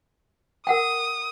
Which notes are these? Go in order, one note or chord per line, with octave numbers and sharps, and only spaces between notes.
A#4 F#5 G5 D#6